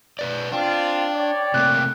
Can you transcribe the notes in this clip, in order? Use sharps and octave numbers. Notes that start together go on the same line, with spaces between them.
B2 B4 D5
C4 D4 F4 G5
C#5 D5
C3 A3 A#3 F#6